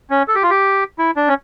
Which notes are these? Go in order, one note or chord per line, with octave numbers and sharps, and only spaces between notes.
C#4
A4
G4
F4
G4
E4
D4
C#4